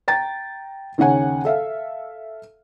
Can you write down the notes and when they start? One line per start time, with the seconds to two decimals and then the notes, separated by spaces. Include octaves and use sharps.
0.08 G5 A#5 A6
0.98 D#2 C#3 C#5 F#5 G#5
1.45 A4 E5 F5